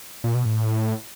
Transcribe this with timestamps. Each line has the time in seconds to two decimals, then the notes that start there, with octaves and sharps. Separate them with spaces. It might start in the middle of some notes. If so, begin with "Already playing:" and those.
0.24 A#2
0.35 B2
0.45 A2